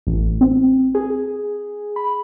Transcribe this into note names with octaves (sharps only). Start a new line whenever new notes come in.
A1
C4
G#4
B5